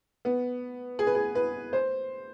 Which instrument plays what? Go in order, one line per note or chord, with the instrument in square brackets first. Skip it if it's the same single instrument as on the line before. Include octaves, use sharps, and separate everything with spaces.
[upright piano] B3
G#4
B4
G#4
B4
C5